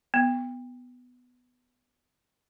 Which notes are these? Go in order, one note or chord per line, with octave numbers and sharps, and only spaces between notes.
B3